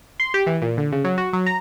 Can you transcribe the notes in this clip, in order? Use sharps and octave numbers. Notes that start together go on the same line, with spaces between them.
C6
G4
E3
A#2
D3
C#3
F#3
F#4
F#3
A#5